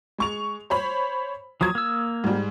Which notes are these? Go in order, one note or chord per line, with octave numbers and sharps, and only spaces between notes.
G#3 C#6 F7
C5 C#5 B5
F3 F#3 D#6 G#6
A#3 E6
G#2 G3